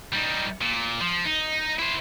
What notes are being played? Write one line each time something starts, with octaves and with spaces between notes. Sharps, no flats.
G3 D#4
A#2
F3
D#4
E4 C5